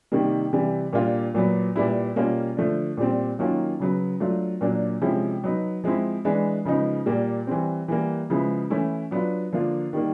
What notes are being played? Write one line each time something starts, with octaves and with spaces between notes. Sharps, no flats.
C3 D#3 G3 A#3
C3 E3 G3
A#2 G3 A#3 D4 F4
A#2 F#3 B3
A#2 G3 B3 E4
B2 G3 A#3 C#4 F4
D3 F3 A3 D4
A#2 G3 C4
D#3 F#3 A#3 C#4 F4
C#3 F#3 B3
F#3 A3 D4 F4
A#2 F#3 A#3 D4
C3 F3 G#3 C#4 E4
F#3 B3 D#4
F3 G#3 C4 E4
E3 G#3 B3 D4
C#3 F3 G#3 B3 D#4
A#2 G3 A#3
E3 G3 C4
E3 G3 A#3
C#3 F3 G#3 B3 E4
E3 A3 C#4 E4
F#3 B3 D4 F4
D3 F3 A#3 D4 F4
D#3 G3 A#3